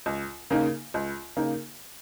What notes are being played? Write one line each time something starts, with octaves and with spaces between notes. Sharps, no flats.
C#2
C#3 A#3 D#4
C#2
C#3 A#3 D#4